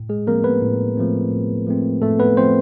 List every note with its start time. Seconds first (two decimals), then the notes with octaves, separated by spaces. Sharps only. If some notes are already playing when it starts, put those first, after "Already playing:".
Already playing: A2
0.09 G#3 G#4
0.27 F3 A3 A#3 C4 A#4
0.44 B3 B4
0.62 A2
0.97 F3 A3 C4
1.32 A2
1.67 F3 A3 C4
2.02 A2 A3 A4
2.19 B3 B4
2.37 F3 A3 C4 C5